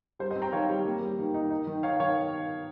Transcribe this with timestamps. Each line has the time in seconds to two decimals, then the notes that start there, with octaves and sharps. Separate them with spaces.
0.19 G3 C5
0.30 C5 D#5
0.36 C4
0.42 G5 A#5
0.52 D#3 C#5 F5
0.69 G3
0.85 A#3
1.02 G3
1.19 D#3
1.34 D#4
1.50 D#4
1.67 D#3
1.83 D#4 C#5 F5
2.00 D#3 C#5 F5